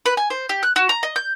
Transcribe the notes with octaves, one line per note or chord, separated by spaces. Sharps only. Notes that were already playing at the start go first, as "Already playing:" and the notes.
B4
G#5
C5
G4
F#6
F#4
A#5
D#5
G6